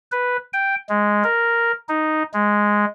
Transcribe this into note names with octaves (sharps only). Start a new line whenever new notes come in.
B4
G5
G#3
A#4
D#4
G#3